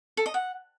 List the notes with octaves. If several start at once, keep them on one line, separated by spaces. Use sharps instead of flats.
A4
D#5
F#5